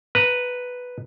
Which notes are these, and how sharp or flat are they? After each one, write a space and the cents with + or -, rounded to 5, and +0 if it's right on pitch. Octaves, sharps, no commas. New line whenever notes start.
B4 +0 A#5 +0